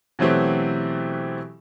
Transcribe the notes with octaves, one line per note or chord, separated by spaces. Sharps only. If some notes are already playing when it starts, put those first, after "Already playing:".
B2 E3 F#3 A3 C4 G4